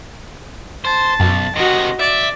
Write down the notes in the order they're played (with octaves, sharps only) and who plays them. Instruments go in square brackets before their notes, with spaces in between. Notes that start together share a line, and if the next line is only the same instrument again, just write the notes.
[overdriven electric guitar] C5 [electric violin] A5
[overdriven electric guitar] B1 [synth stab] F#2
[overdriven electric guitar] C3 D#3 [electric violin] F#4 D#5
[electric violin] D5 [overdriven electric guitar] E5